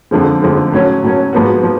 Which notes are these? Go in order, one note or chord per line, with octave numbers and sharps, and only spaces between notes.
F2 D3 F3 G#3
F2 D3 F3 G#3
A2 F#3 C#4
A2 F#3 C#4
G#2 F3 B3 F#4
F3